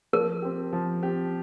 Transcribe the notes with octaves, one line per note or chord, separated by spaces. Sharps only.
F3 A#4
C4 G4
F3
C4 G4